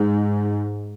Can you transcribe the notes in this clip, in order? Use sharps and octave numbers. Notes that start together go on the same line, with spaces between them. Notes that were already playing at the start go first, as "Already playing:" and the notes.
Already playing: G#2